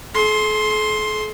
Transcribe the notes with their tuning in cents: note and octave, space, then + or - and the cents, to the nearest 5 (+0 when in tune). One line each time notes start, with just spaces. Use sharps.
A4 -45 C6 +10